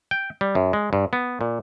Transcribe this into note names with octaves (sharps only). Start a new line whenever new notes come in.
G5
G3
F#2
G#3
G2
B3
A#2